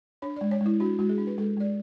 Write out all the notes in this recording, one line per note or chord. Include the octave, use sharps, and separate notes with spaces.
D4 C#5
D5
G#3
C#5
G#3
E4
D4 F#4
G#3 F#4
G#4
D4
B4
G#3 A4
G#3 D5